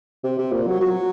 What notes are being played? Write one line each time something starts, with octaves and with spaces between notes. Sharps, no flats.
C3
C3
A#2
F#3
F#3